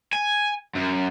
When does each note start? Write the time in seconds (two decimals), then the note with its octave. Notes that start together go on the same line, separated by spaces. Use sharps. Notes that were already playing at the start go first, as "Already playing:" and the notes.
0.13 G#5
0.75 F#2